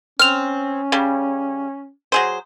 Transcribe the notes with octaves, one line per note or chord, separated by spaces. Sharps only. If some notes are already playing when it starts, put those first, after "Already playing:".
C4 C#4 F6 F7
C#3 G3
F#3 G#4 C5